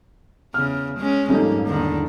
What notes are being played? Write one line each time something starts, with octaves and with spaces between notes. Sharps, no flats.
E2 C#3 F6
G#3 C#4
F2 G#2 G3 A#3 C#4 D#4 A4
E2 D3 D#3